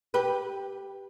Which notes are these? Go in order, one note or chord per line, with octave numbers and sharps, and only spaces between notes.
G4 B4